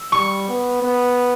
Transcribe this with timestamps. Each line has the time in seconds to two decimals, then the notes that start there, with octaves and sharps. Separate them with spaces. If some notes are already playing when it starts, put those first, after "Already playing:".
Already playing: E6
0.12 G3 C#6
0.48 B3
0.82 B3